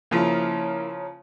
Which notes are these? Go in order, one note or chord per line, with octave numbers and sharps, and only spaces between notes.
C#3 F3 A#3 E4 C#5 A#5 D#6